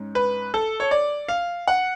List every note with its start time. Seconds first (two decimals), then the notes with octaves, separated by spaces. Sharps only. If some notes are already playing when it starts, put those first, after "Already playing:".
Already playing: G#2 C#4
0.15 B4
0.54 A4
0.80 C#5
0.91 D5
1.28 F5
1.68 F#5